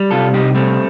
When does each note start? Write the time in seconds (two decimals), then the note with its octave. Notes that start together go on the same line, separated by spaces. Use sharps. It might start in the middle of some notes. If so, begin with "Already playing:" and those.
Already playing: G3
0.11 C3 F4 A4
0.33 C2 D#4 G4
0.55 G3 A3 C4